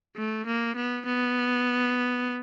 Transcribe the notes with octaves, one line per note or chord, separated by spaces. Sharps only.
A3
A#3
B3
B3